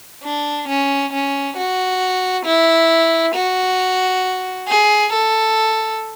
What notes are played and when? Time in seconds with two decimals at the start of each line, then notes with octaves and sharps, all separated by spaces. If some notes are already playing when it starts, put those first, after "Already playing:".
0.24 D4
0.68 C#4
1.13 C#4
1.57 F#4
2.45 E4
3.35 F#4
4.68 G#4
5.13 A4